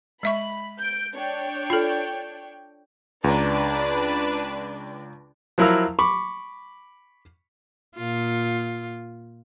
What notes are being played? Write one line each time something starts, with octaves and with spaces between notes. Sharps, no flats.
G#3 E5 B5 C#6
G6 D7
D4 C#5 G5
F4 A4
C#2 D4 B4 D5 A#5
F3 F#3 E4 A#4 F5 E6
B5 C#6 D6
A#2 F4